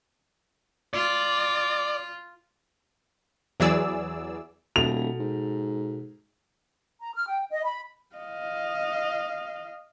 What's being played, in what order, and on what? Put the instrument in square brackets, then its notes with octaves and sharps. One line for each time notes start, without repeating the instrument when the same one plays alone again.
[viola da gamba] F4 [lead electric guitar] D5
[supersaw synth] E2 E3 F#3 G#4 D5 E6
[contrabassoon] D#1 [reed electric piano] B2 F#4 A4 [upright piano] F7
[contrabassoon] G#2
[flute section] A#5
F6
G5
D#5
B5
[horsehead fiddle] D#5 F5